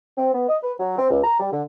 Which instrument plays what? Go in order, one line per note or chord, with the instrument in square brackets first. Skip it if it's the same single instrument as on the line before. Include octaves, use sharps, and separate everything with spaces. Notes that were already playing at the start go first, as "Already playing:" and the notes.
[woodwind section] C4
B3
D#5
B4
F#3
C4
C#2
A#5
G3
D3